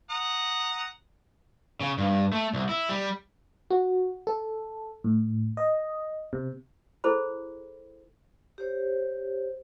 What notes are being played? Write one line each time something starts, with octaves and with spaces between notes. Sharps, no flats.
F#5 A#5 D#6
C#3
G2
A3
C2
E4
G3
F#4
A4
A2
D#5
C3
E4 G#4 A4 C5 B5
G4 C5 C#5